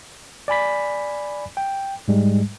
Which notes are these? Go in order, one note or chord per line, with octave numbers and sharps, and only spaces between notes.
D5 G#5 B5 B6
G5
G#2 G3 G#3